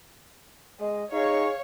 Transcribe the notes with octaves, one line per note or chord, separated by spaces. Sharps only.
G#3 D#5
D#4 G#4 C#5 F5